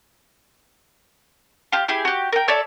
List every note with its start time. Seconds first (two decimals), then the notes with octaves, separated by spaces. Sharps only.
1.72 F4 G4
1.88 E4 G4 G#4 G#5
2.05 F#4 G4
2.32 A#4 G5
2.48 A4 C#5 D5 E5